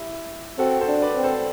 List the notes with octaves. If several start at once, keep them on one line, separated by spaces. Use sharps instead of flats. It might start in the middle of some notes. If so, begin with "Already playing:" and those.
Already playing: E4 G4
C4 F#4 A4
A4 C5
D4
B4 D5
C4
A4 C5